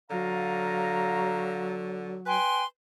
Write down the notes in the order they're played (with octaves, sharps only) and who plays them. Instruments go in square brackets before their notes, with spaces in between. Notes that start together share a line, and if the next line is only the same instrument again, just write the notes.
[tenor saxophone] D3 [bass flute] F#3 [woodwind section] F5 A#5
[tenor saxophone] B4 [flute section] G5 G#5 C6